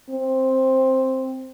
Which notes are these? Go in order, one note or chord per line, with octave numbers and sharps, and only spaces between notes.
C4